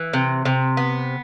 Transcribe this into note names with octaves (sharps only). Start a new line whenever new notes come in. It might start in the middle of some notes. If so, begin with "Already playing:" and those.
Already playing: E3
C3
C3
B3